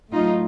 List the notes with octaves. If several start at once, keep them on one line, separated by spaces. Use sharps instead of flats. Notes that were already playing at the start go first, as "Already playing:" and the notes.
A2 F#3 A3 D#4 F4